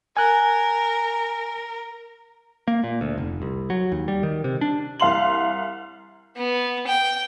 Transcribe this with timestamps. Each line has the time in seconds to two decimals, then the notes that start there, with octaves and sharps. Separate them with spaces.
0.17 A#4 G#5 F#6
2.68 A#3
2.84 A#2
3.01 D2
3.18 F1
3.42 C2
3.70 F#3
3.92 D#2
4.08 G3
4.23 D#3
4.44 C3
4.61 D4
5.00 C2 F5 C6 F#7
6.37 B3
6.87 G5